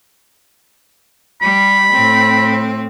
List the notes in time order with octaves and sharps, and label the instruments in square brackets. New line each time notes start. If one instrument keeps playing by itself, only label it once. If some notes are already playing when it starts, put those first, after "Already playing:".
[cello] G3 [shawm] B5
[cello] A2 C4